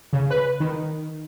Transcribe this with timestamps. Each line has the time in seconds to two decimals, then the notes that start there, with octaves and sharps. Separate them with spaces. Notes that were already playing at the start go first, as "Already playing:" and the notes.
0.13 C#3
0.30 B4
0.60 D#3